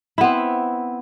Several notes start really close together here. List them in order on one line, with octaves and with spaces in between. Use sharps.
E4 B3 C4